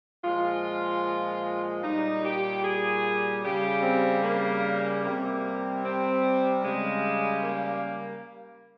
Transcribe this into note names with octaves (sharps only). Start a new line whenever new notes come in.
A#2 F3 G#3 F4
A#2 G3 D#4
G4
G#4
C#3 G3 G4
C4
A#3
C3 G3 A#3
C4
C#3 G3 G#3
A#3